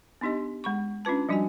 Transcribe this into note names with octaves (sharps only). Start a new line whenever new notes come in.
B3 D4 D#4 G4 D#5
G#3 B5 C#6
C#4 D4 F4 B4 A5
F3 G3 D4 F#4 D#5 G#5